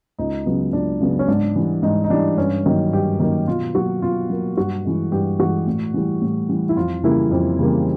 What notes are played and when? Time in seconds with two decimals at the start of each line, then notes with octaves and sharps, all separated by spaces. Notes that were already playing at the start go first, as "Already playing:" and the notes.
0.19 C#2 D#4
0.46 C#3 F#3 B3
0.73 C#2 D4
1.01 C#3 F#3 B3
1.19 C#4
1.28 G#2 D4
1.56 E3 G3
1.83 G#2 D#4
2.04 D#4
2.10 E3 G3 D4
2.38 G2 C#4
2.65 D#3 F#3 A#3
2.93 G2 G4
3.20 D#3 F#3 A#3
3.47 B2 F4
3.75 F#3 A#3 F#4
4.02 B2 F4
4.30 F#3 A#3
4.57 G2 F#4
4.84 E3 G#3
5.12 G2 G4
5.39 E3 G#3 F#4
5.67 A2
5.94 E3 G3
6.22 A2
6.49 E3 G3
6.69 E4
6.76 F2 F4
7.04 C#3 E3 G3 A#3 E4
7.31 F2
7.59 C#3 E3 G3 A#3